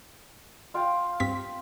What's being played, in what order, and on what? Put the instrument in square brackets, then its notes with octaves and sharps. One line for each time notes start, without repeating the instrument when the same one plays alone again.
[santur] F4 F5 G5
[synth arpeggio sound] G2 C4 B6